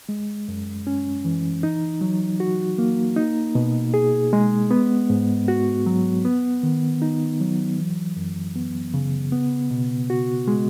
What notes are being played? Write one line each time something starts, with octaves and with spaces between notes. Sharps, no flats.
G#3
F#2
C#4
E3
D#4
F#3
F#4
A#3
D#4
B2
G#4
G#3
B3
G#2
F#4
F#3
B3
D#3
D#4
F#3
E3
F#2
B3
C#3
B3
B2
F#4
G#3